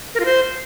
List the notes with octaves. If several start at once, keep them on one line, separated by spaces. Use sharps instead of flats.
A#4
F4
C5